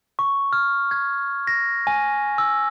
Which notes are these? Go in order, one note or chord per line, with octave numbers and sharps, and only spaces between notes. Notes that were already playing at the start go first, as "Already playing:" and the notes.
C#6
F6
G#6
A#6
G#5
E6